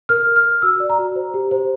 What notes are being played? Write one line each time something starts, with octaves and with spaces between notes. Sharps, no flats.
A#4 F6
A#4
F6
A#4
F#4 E6
D5
A#5
F#4
C5
G4
C5